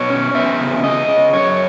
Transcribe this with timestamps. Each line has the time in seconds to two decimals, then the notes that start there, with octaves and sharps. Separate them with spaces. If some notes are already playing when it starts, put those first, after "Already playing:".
Already playing: B2 C#5
0.10 C#4
0.35 B3 E5
0.60 C#3
0.84 C#3 D#5
1.08 C#3
1.33 F#2 C#5